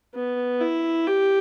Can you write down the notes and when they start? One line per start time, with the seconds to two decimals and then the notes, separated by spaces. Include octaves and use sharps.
0.15 B3
0.61 E4
1.07 G4